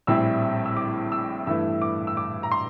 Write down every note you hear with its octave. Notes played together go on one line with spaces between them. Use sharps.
A#1 A2 G3 C4 E4 E6
E6
D6
E6
G2 E3 A3 E4 E6
D6
E6
D6
A#5
C6